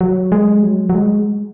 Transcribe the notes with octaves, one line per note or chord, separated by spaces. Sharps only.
F#3
G#3
F#3
F#3
G#3